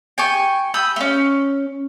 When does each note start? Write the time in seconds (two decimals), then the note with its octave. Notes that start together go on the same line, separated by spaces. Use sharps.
0.18 G5 G#5 C#6
0.74 B5 D#6 E6 G6
0.96 A3 C#4